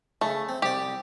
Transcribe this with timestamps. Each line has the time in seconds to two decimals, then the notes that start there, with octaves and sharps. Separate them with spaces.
0.21 C#3 A3
0.49 C4
0.62 C2 G4 D5